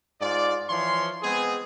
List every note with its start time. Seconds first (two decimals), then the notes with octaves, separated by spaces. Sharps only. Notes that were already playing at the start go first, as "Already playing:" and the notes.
0.21 G#2 F4 D5
0.70 E3 F3 C#5 C6
1.23 G#3 B3 C4 G#4